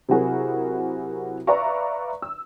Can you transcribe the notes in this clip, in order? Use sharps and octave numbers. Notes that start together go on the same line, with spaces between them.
C3 F#3 E4 F#4 G#4 A#4
B4 D5 E5 F5 A#5 C#6
E6